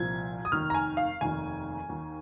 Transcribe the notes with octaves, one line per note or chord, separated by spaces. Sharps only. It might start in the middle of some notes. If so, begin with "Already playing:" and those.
Already playing: C2 A#2 F3 G#6
D#6
F1 D#2 D#3 F6
A#5
G#5
F5
F1 D#2 D#3 G#5
D#2 D#3